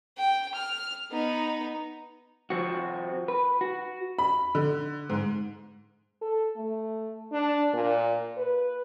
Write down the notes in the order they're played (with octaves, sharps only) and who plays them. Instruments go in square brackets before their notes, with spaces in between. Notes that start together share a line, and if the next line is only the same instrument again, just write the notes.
[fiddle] G5
F6
B3 D#4
[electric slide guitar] F3 C4 F#4
B4
F#4
[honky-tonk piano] B5
D3
G#2
[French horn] A4
A3
D4
A#2
B4